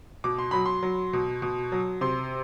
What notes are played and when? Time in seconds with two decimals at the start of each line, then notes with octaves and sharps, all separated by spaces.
0.24 B2 D6
0.39 C6
0.51 F#3 B5
0.66 C6
0.83 F#3
1.13 B2
1.42 B2
1.72 F#3
2.01 C3 C6